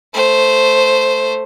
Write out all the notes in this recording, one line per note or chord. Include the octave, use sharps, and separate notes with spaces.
A3 C5